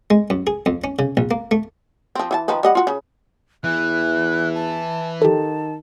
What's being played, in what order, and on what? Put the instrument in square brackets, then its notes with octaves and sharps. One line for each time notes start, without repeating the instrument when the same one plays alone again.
[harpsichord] G#3
F#2
G#4
F2
C#4
C#3
A#1
A#3
A3
[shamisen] F3 C4
E3 G4 A5
D#3 F3 B4
G3 D#5 F#5
F4 F#4
C#3
[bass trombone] E2 [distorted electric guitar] E3 [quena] F#6
[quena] A5
[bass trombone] D#3 [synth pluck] G4 A4 [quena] A5